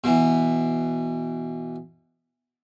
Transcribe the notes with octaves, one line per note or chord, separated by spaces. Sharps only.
B2 E3